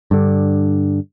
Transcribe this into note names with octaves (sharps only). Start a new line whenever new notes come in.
G2 D3